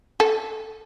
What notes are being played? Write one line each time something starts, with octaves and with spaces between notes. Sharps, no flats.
A4